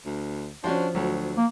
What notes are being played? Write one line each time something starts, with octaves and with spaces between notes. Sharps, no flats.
D2
F3 C#4 D4 F#4 C5
D2 F#3
A#3